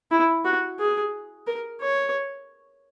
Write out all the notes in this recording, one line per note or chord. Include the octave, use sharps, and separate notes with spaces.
E4
F#4
G#4
A#4
C#5